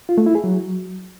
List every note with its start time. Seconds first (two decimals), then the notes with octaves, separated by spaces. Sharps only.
0.09 F4
0.18 A3
0.26 E4
0.35 G#4
0.44 F#3